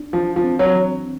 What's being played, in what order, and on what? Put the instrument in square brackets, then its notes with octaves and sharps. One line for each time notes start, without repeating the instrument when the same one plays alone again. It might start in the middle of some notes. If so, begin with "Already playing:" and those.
Already playing: [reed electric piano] D4
[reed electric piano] E3 [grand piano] F3
[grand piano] F3
[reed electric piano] C4
[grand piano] F#3
[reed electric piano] E3